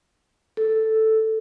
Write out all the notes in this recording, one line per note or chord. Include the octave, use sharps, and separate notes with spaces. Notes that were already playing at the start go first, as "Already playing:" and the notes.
A4